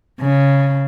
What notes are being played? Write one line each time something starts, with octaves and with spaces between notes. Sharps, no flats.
C#3